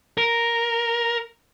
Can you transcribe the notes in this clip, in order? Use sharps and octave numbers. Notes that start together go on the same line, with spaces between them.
A#4